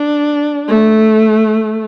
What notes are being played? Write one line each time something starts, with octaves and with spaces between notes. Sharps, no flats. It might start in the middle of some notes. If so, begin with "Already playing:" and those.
Already playing: D4
A3